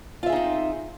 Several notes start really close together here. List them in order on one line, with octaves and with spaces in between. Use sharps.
F4 E5 G#4 D#4 C4